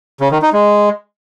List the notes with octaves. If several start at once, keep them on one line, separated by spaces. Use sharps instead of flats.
C#3
D#3
D#4
G#3